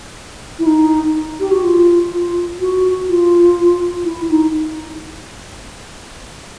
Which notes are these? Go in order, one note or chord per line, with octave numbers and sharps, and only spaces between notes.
E4
D#4
G4
F#4
F4
F4
F#4
F4
E4
D#4